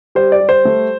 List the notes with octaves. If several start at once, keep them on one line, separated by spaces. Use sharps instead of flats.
G3 C5
D5
G3
C5
A3